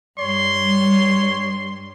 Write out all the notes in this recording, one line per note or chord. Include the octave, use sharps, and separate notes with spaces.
G2 G3 C#5 C6